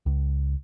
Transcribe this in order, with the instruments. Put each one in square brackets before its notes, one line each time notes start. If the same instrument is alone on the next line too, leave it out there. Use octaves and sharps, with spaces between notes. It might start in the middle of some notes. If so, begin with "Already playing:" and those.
[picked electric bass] C#2